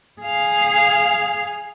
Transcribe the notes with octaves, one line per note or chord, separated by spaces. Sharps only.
G#4 F5